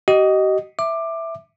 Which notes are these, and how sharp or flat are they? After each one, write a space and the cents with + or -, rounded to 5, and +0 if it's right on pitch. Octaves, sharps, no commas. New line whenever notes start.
G4 -45 D#5 +0
E5 +0 D6 +15